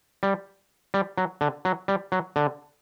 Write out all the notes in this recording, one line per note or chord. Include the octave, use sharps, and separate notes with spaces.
G3
G3
F#3
D3
F#3
G3
F#3
D3